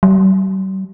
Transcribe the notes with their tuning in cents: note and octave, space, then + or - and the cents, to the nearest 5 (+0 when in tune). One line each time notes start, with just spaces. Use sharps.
G3 -45